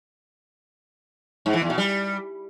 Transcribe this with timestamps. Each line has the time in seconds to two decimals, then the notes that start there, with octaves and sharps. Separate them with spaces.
1.46 G#2
1.54 E3
1.62 E2
1.70 B2
1.78 G3